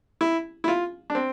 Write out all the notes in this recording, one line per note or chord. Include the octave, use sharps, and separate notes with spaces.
E4
E4
F4
D4
C4